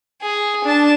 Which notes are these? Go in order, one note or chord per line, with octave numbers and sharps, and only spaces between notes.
G#4
D4 A5